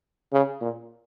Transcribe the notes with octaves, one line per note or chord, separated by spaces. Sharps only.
C#3
A#2